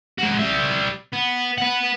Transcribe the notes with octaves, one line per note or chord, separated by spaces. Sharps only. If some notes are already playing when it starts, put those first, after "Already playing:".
G#3 F#4
G3 E5
B3
B4 F#5